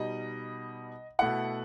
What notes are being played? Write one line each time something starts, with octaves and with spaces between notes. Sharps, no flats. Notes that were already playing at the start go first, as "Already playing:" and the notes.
Already playing: B2 G3 D#4 D#5
B2 A3 E4 F#5